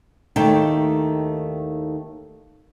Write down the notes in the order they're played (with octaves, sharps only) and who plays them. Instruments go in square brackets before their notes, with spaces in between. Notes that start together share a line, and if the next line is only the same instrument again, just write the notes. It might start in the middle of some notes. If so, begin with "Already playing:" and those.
[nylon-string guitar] D#2 D#3 A3 D#4 E4 G5